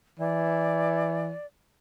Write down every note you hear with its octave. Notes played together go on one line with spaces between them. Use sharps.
E3 D5